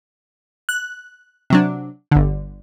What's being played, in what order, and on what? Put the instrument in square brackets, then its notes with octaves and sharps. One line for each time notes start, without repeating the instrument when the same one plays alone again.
[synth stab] F#6
C3 F#3 D4
G1 D3